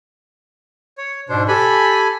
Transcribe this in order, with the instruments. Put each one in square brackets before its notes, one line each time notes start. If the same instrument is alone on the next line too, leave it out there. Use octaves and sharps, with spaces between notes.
[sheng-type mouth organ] C#5
[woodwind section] G#2 B2 [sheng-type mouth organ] D4 C5
[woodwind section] G4 [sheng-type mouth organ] A4 G#5 B5